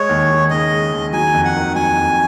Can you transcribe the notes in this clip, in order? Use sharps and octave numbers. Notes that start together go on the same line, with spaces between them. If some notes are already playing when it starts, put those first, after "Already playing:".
Already playing: G#3 C#5
D#2
D#2
C#3 D#5
G#3
D#2
F#3 G#5
F2
F#5
D#3
F#3 G#5
F2